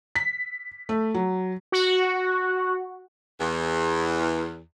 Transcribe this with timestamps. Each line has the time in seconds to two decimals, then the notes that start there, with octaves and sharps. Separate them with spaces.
0.16 B6
0.89 A3
1.14 F#3
1.72 F#4
3.40 E2